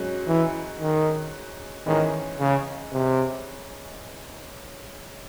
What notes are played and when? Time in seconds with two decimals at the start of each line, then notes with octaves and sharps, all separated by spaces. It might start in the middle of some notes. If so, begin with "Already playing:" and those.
Already playing: G#2 F#3 C#4
0.28 E3
0.80 D#3
1.87 G#2 D#3 E3 G#3 C#4
2.40 C#3
2.93 C3